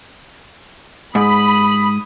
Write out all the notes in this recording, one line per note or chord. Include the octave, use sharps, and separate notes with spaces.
G#2 B5 D#6